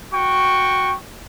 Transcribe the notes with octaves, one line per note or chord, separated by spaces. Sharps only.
F#4 G5 C#6